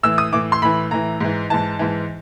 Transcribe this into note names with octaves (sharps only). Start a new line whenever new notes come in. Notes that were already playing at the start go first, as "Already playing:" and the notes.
A2 E3 E6
D#6
A2 E3 D6
C6
A2 E3 B5
A2 E3 A#5
G#2 E3
G#2 E3 A5
G#2 E3